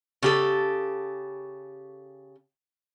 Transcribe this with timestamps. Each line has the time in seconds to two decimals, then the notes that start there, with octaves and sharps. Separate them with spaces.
0.22 C#3 G4 A4